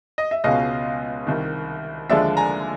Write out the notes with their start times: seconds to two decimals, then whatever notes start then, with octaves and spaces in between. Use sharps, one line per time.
0.18 D#5
0.31 E5
0.44 C#2 B2 G#3 C#4 F4 D#5 F5
1.27 C2 C3 D#3
2.09 D#2 D3 F3 G#3 D5 E5
2.37 G#5 A#5